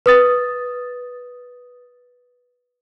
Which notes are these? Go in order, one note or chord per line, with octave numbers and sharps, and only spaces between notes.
B4 D#6 A6